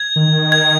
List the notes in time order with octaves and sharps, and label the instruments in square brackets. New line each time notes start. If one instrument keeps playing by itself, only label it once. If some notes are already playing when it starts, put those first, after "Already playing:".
Already playing: [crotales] G#6
[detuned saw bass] D#3
[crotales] G#6